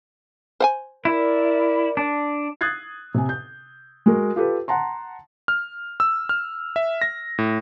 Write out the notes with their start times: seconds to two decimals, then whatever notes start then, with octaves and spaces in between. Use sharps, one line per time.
0.60 C5 F#5 G#5
1.05 E4 A#4 D5
1.97 D4
2.61 D#6 F#6 G#6 A6 C7
3.14 C3 G#5
3.29 G6
4.06 G#3 F#4 A#4
4.36 F4 G4 A4 B4
4.68 F#5 A5 A#5 C6
5.48 F6
6.00 E6
6.29 F6
6.76 E5
7.02 A#6
7.38 A2